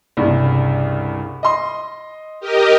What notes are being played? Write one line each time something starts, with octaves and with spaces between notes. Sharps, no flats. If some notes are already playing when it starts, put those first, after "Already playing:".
C2 G2 C#3
D#5 C6
G4 A#4 D#5